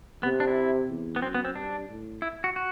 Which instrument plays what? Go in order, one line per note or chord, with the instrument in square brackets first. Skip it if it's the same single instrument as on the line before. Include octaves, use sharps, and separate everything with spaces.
[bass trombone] C3 [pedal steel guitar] B3
[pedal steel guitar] D4
E4
[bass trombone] E2
[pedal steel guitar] B3
[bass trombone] F#2 [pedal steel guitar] C4
[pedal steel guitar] B3
C4
[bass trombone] G2 [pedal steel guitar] D4
[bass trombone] A2
[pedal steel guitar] E4
F#4
F#4